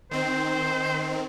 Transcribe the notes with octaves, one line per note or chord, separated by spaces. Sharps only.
D#3 C4 C5